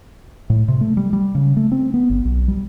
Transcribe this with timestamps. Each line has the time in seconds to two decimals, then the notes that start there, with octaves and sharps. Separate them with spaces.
0.50 A2
0.68 C3
0.81 A3
0.97 G3
1.13 G3
1.35 C#3
1.57 A3
1.72 C4
1.94 B3
2.10 G1
2.25 B1
2.48 G3